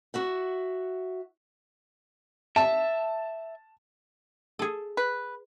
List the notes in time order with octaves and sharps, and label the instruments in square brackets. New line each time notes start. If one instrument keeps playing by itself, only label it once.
[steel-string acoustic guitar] F#4 E5 F#5
[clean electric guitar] E5 [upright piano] A5
[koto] G#4 A4
[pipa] B4